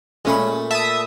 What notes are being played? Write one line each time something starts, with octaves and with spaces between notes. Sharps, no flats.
A#2 G#3 A3 C#4 B5
E5 A5 D#6